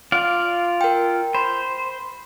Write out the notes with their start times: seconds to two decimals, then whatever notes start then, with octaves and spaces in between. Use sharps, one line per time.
0.12 F4 D5 F5
0.81 A#4 G5
1.35 C5 B5